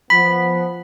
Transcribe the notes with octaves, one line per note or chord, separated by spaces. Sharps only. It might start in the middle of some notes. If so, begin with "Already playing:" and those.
F3 B3 B5 B6